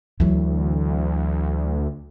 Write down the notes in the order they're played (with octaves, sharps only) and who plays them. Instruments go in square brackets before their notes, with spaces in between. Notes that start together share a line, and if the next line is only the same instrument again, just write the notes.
[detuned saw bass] D2 [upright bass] E3 F#3